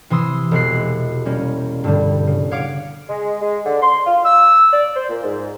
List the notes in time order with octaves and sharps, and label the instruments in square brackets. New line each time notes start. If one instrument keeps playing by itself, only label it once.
[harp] C3 E3 C6 D#6 E6
E1 C3 G#3 F#4 F#6 C7
G3 A#3 C#4
G2 D3 G3
C#3
C#5 F5 F#5 D6
[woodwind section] G#3
G#3
D3
C6
F4
E6
D5
C5
A#2
G#2